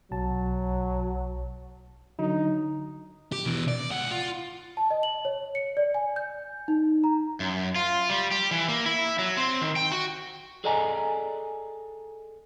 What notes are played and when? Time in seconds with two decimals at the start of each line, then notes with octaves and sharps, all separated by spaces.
0.11 B1 F#3 A5
2.19 D3 F#3 D#4
3.32 G4
3.46 B2 E3
3.68 D5
3.91 C#2 F#5
4.12 F4
4.77 A5
4.91 D#5
5.03 F#7
5.25 C#5
5.55 C#7
5.77 D5
5.94 G#5
6.16 G6
6.68 D#4
7.04 A#5
7.40 F#2
7.76 F4
8.09 G3
8.31 G4
8.51 E3
8.68 A#3
8.86 E4
9.19 F#3
9.37 C4
9.62 D#3
9.76 G5
9.92 F#4
10.64 G#4 A4 D5 D#5 G#5 A#5